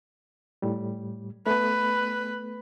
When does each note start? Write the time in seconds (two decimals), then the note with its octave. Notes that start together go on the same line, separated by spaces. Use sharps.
0.62 A2 G3
1.47 A3 B3 B4